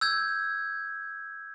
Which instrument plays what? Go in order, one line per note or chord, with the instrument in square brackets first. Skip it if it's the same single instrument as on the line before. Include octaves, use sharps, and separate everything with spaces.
[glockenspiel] E6 G6 G#6